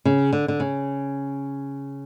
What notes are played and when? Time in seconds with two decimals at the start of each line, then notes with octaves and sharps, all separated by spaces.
0.05 C#3
0.33 D3
0.48 D3
0.60 C#3